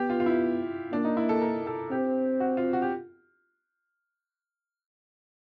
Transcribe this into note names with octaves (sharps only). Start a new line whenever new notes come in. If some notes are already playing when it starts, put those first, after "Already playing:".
Already playing: B3 G4
F4
F4
E4
A#3 D4
D#4
E4
A4
A#4
A4
C4 G4
F#4
F4
F#4
G4